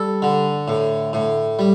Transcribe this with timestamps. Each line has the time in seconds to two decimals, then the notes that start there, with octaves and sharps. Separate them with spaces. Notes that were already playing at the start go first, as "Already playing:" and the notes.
Already playing: G3 A4
0.22 D3
0.68 A2
1.13 A2
1.59 G3